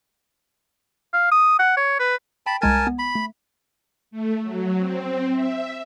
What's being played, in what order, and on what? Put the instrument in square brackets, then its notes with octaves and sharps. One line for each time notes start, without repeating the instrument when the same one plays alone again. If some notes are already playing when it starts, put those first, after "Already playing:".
[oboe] F5
D#6
F#5
C#5
B4
[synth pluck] G5 [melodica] A5 B5
[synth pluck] C2 G#3 G#6 [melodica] A#4 G#5 A5
[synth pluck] B3
[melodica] B5
[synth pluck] A3
[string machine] A3
F#3
C4
E5